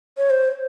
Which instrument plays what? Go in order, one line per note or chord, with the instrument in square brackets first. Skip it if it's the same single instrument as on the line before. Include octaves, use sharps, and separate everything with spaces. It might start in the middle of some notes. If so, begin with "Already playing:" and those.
[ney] C#5
C5